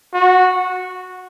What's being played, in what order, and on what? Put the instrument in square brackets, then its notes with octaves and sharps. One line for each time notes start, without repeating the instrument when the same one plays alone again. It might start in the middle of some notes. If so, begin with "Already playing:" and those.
[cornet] F#4